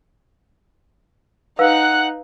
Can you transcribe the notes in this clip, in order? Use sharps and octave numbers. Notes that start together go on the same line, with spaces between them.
D#4 B4 F5 F#5 E6 F#6